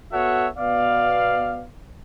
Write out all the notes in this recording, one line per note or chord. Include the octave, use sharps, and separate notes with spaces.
B3 F#4 A4 C#5 E5 F#5
B2 B3 D5 F5